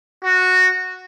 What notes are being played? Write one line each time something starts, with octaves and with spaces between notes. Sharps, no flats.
F#4